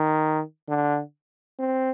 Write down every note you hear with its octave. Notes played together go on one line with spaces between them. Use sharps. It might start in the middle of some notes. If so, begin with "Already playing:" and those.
Already playing: D#3
D3
C4